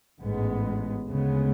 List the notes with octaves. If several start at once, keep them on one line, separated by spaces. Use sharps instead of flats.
A1 G#2 G#3 B3
D2 C#3 G#3 B3